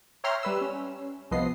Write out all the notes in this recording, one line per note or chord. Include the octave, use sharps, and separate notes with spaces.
C#5 E5 G5 A#5 C6 F6
G3 B4 E6
C#4
C2 F3 B3 D#5 C7